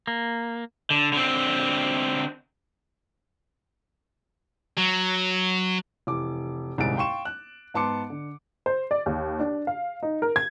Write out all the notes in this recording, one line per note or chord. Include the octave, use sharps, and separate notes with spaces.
A#3
D3
D3 C4
F#3
F1 E3 D6
D#1 C2 G#2 G#4 A6 D7
F5 G5 C6 C#6 E7
F#6
G#2 B3 A5 C6 D6 C#7
D3
C5
D5
D#2
D4
F5
D#4
A#4
G#6